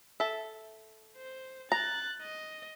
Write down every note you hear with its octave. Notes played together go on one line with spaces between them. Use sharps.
A4 E5
C5
A#5 F#6 A6
D#5